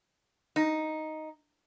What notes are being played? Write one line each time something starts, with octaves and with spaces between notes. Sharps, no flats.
D#4